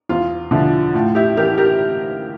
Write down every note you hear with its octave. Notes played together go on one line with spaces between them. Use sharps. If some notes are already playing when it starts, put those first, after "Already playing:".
E2 F4
D3 F3 E4
A2 F4
E4 G4
E3 G4 A#4
G4 A#4